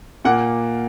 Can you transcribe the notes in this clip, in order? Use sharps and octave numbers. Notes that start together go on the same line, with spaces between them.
A#2 A#3 F#5